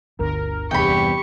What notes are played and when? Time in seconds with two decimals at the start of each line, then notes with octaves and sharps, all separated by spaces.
0.19 G1 D2 A#4
0.71 E2 G2 C3 G4 G5 B5 C#6